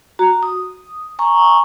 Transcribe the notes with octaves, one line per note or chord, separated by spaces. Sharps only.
F#4 A#5
D#6
G#5 A#5 C#6